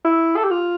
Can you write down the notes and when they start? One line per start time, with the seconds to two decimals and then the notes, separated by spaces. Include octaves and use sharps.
0.05 E4
0.36 A4
0.44 G4
0.51 F4